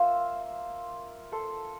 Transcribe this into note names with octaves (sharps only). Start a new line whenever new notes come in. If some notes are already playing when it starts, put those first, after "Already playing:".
Already playing: A#3 F4 C5 E5
A4 C5